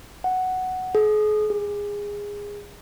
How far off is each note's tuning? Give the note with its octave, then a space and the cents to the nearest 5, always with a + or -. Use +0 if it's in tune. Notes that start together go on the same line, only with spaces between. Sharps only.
F#5 +5
G#4 +40
G#4 -20